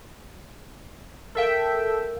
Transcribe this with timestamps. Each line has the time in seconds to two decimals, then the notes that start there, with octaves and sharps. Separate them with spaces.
1.35 A4 A#4 E5 F5 G5